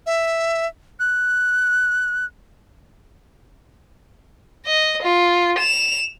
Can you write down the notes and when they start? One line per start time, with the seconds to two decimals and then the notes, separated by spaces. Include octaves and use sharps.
0.06 E5
1.00 F#6
4.66 D#5
5.03 F4
5.58 E7 F7